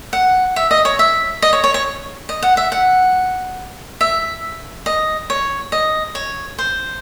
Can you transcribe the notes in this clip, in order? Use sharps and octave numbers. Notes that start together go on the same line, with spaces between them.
F#5
E5
D#5
C#5
E5
D#5
C#5
C#5
C#5
D#5
F#5
E5
F#5
E5
D#5
C#5
D#5
C#5
C5